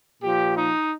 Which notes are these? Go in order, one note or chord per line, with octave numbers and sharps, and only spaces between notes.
A#2 F3 G4
D#4